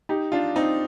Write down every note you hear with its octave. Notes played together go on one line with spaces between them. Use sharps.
D#4 G4
D4 F4
C4 D#4